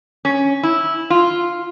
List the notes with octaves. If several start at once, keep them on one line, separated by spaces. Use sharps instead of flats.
C#4
E4
F4